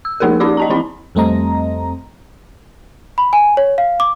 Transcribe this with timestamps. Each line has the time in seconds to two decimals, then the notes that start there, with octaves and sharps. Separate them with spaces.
0.05 E6
0.20 F3 A#3 D#4 G#4 A#4
0.40 C#4 D#4 G4 D5 D6
0.57 D#5 A5 A#5
0.70 E3 C4 E4 B5
1.15 F2 G3 A3 C4 D#5 A#5
3.18 B5
3.33 G#5
3.57 C#5
3.78 F5
4.00 D6